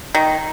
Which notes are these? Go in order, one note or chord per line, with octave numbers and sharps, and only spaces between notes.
D#3